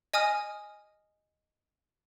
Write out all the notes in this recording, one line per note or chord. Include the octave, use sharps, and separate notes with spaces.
D#5 G#5 D#6 F6